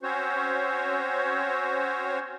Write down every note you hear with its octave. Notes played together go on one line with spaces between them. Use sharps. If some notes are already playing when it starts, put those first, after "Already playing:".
C4 C#4 F#4 C5 C#5